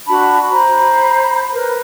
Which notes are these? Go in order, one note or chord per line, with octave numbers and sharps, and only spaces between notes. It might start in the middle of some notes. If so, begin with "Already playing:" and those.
D4 F#4 A5 B5
C5 A#5 B5
A#4 B4